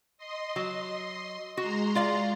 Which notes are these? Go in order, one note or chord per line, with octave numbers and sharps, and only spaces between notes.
D#5 C6
F#3
G#3 F#4 A#5 C6
F4 D5 F5